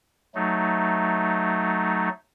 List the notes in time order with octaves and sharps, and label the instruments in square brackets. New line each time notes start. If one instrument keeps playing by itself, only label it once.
[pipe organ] F#3 A3 D#4